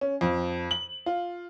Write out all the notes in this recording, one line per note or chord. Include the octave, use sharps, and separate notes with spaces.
C#4
F2
F#7
F4